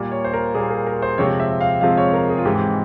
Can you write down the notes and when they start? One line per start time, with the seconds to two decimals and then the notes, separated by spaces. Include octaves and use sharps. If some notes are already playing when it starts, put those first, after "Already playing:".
Already playing: A#2 G3 A#3
0.12 C#5
0.24 C5
0.33 A#4
0.54 A#2 G3 A#3 G#4
0.71 A#4
0.87 A#4
1.02 C5
1.18 F2 C3 F3 G#3 C4 C#5
1.40 E5
1.61 F5
1.81 F2 C3 F3 G#3 C4 F5
1.97 C#5
2.13 A#4
2.29 G#4
2.38 F4
2.45 G#2 E3 G#3 C4 G4